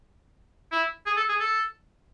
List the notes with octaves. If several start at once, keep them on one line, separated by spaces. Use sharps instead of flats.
E4
G#4
A4
G#4
A4